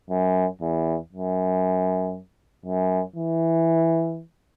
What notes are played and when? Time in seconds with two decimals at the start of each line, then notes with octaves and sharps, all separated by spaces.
0.10 F#2
0.61 E2
1.12 F#2
2.66 F#2
3.16 E3